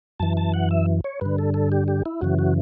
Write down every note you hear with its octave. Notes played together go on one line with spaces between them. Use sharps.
F#2 E3 A5
A5
F#5
E5
C#5
G2 D3 B4
A4
A4
G4
G4
E4
F#2 C#3 E3 F#4
F#4